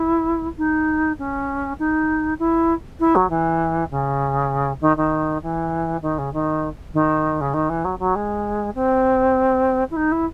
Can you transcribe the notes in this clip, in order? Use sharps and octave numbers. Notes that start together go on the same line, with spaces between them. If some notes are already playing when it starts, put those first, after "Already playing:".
Already playing: E4
D#4
C#4
D#4
E4
E4
F#3
E3
C#3
D#3
D#3
E3
D#3
C#3
D#3
D#3
C#3
D#3
E3
F#3
F#3
G#3
C4
E4
D#4
E4